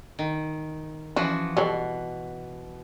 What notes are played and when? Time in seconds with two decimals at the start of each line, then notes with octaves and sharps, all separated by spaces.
0.19 D#3
1.16 E3 F3 C#4 F#4
1.57 B2 G3 A4 C#5